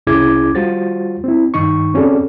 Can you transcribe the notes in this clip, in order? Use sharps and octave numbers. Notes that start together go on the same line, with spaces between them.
C2 C#4 E4 G#4 D6 G#6
G3 F4 F#4 C5 A6
C4 E4
G2 D#3 D#4 C#6
C4 C#4 F#4 G#4 A4 D5